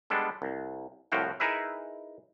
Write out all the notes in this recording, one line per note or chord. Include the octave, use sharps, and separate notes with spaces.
G3 G#3 B3 D4 A4
C2
C2 A2 F3 F#4 F5 G5
D#4 E4 G#4 A#4 B4 E5